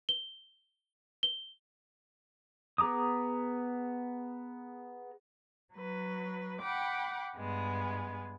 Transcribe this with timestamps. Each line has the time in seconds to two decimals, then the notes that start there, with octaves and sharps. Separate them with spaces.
0.09 G7
1.23 G7
2.78 B3 G#4 A#5 D6 D#6
5.74 F#3 B4
6.60 F#5 G5 B5 D6
7.38 G2 G#3 B3